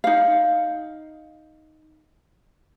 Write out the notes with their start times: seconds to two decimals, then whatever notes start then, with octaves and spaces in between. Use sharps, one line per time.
0.04 D#4 F5